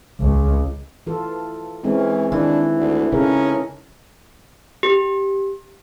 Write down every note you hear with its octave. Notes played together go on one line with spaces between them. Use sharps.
C#2
E3 F4 A4
E3 G#3 C4 C#4
D#3 E3 D4
D2
C#3 C#4 D#4 A4 A#4
G4